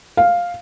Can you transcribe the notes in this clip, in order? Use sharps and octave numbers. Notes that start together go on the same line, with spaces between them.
F5